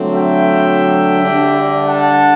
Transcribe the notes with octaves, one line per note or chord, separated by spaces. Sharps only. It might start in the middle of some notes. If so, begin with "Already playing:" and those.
Already playing: D3 F#3 A3 C4
E5 G5
D3 G3 D4
F#5 A5